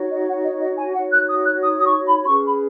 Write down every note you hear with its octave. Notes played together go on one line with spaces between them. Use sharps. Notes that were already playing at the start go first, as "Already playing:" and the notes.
Already playing: D#4 F#4 C#5
D#5
F#5
D#5
D#5
G#5
D#4 F#4 C#5 F#5
F#6
D#6
F#6
D#6
D#6
C#6
B5
B5
C#4 G#4 B4 C#6
B5